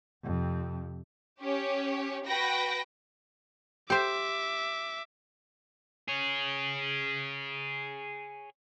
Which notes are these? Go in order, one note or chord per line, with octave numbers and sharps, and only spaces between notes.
F2 C3
C#4 G4 C#5
F#4 B4 G5 A#6
G4 C5 E5 D6
G#4 C#5